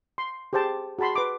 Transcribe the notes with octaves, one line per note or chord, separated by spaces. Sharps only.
C6
G4 G#4 C5 G5 A5
F#4 G#4 A5 B5 C6
B4 D6